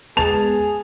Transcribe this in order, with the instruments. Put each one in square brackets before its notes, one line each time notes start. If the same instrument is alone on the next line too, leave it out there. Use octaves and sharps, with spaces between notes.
[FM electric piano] G#3 B3 [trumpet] G#4 [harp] A5 [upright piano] F7